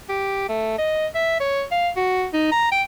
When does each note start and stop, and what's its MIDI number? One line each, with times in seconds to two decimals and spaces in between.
0.09 0.47 67
0.49 0.74 57
0.78 1.06 75
1.15 1.38 76
1.40 1.63 73
1.71 1.89 77
1.96 2.26 66
2.33 2.50 63
2.52 2.67 82
2.72 2.82 79